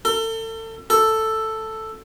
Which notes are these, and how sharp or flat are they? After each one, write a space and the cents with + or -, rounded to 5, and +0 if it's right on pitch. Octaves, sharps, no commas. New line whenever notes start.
A4 +35
A4 +5